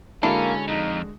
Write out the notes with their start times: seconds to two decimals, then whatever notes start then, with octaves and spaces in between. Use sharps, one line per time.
0.23 D3 G#3 A#3 C#4 D4 E4 F#4 A4
0.68 F2 D#4